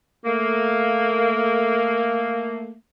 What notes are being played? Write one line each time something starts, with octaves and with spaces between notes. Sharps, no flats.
A3 A#3